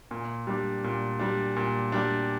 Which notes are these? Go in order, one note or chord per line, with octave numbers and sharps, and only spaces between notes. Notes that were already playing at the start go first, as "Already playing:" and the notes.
A#2
G3 D4
A#2
G3 D4
A#2
G3 D4